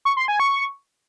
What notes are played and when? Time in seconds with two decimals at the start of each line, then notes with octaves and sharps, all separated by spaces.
0.05 C#6
0.17 C6
0.28 G#5
0.40 C#6